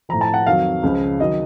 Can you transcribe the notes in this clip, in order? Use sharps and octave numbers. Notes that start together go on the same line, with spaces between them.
A2 F3 A#5
A5
F#5
F2 D#3 F#3 F5
C#2 C#3 F3
D#3 F#3 D#5